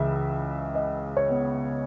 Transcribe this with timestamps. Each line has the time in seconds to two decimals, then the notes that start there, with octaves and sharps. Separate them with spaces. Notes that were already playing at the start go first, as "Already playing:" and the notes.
Already playing: C#2 C#3 E3 E5
0.75 D#5
1.17 C#5
1.30 B3